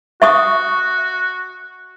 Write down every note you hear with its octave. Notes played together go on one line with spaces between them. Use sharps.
F#4 E5 C#6 D#6